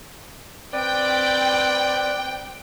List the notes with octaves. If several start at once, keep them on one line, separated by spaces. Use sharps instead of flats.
C4 B4 D5 G5